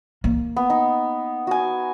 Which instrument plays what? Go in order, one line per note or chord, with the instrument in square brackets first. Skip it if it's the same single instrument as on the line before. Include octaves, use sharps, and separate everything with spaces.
[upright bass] A#3
[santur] B3
D#4
F#4 G#5